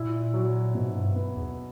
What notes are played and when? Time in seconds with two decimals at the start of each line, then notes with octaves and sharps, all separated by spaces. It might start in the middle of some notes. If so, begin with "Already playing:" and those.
Already playing: A#2 E4
0.34 F#3
0.75 G#2 B2
0.96 G2
1.16 B3
1.36 E2